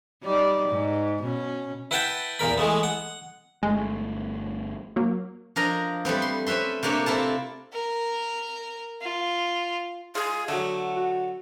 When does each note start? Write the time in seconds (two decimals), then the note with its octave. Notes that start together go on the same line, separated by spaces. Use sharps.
0.24 G3 D#4 D5
0.69 G#2
1.23 B2 C#4
1.91 E4 B4 F#5 G5 A5
2.39 E2 A#2 A#4 B5
2.58 E3 G#3 A3 B3
2.83 F#5
3.63 G1 G#3 A3
4.96 F#3 A#3
5.56 F3 D4 A#4 D#5 A#5
6.05 G3 A3 B3 C4
6.22 C6
6.47 C4 C#4 B4 E5 C6
6.83 C3 A3 A#3 D4 C#5
7.06 C4 E4 F4 A5
7.73 A#4
9.01 F4
10.15 G#3 F4 G#4
10.48 D3 F#3 A3 F#5
10.96 F#4